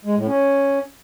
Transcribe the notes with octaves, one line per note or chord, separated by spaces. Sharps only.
G#3
A2
C#4